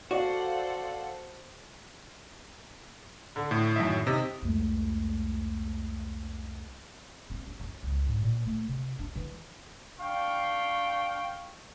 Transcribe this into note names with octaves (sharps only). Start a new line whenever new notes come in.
F#4 A4 C5 D5 F5 F#5
D3
A2
F#2 D#3 E5
C3 D#4
C2 F2 G#3 A3
C4
C#4
F#2
C#2
G#2
A#2
A3
C3
D4
E3
D4 F5 G5 C#6